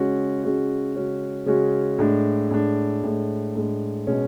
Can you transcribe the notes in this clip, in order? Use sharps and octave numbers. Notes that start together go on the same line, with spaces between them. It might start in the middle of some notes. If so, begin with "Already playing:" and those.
Already playing: C#3 G#3 C#4 F#4
C#3 G#3 C#4 F#4
C#3 G#3 C#4 F#4
C#3 G#3 C#4 F#4
A2 G#3 D4
A2 G#3 D4
A2 G#3 D4
A2 G#3 D4
B2 G#3 C#4